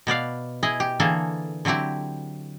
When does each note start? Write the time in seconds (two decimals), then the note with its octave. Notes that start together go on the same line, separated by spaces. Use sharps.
0.07 B2 B3 D5 F5
0.63 E4 G#4 D#5
0.80 G4
1.00 D3 E3 A#3 G#4 A4
1.65 D3 F#3 C4 E4 G4